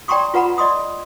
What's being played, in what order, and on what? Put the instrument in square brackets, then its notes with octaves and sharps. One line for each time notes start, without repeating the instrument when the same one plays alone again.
[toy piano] D5 G5 A#5 C6 C#6 D#6
F4 B4 F#5 A#5 B5
D5 D#5 C6 D#6